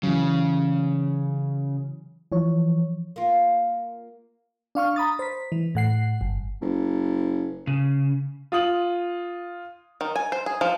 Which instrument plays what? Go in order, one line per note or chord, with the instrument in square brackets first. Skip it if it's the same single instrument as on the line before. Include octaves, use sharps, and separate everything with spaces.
[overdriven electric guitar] C#3 [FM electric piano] E3 F#3
[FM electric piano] E3 F3 C#5
[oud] A#3 F4
[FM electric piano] D4 F5 C#6 F6
A#5 B5 D#6 A6
C5 B6
E3
A2 F#5 C7
G1
[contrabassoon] F#1
[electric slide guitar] C#3
[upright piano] F4 D#6 F#7
[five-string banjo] D#3
G#5
C5
G#4
F3